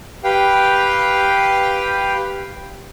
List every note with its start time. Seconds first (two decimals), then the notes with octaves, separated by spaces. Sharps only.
0.24 G4 B4 F5 G5